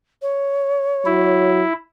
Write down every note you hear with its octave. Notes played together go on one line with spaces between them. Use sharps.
C#5
F#3 E4